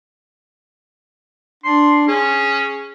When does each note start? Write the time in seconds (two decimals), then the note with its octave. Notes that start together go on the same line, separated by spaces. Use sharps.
1.64 D4 C6
2.08 C#4 G#4